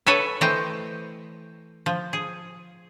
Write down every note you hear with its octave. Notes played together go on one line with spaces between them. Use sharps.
A4 B4 C#5 E5 F#5 G#5
E3 A3 C5 D#5 G5
F3
G#4